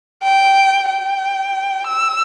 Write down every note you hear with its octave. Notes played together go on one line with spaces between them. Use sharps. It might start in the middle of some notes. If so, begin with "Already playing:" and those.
G5
G5
E6